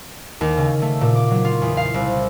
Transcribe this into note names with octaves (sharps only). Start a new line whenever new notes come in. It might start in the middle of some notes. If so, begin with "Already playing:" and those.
D#2
C#3
A3
A#2
D6
F#3
F4
E2
F5
C2